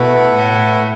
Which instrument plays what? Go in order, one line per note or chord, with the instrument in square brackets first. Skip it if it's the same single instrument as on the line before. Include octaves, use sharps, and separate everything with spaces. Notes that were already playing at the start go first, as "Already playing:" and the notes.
Already playing: [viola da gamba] B2 [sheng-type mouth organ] A3 E4 B4 F#5
[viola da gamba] A2